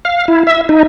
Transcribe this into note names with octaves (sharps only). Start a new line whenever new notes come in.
F5
E4
E5
D#4